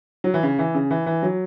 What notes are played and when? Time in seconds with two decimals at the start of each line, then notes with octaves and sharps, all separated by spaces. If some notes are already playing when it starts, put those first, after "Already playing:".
0.24 F#3
0.34 E3
0.43 C#3
0.59 E3
0.75 C#3
0.91 E3
1.06 E3
1.23 F#3